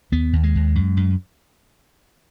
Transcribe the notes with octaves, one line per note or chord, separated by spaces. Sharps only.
D#2 B3
D#2
G#3
D#2
F#2
F#2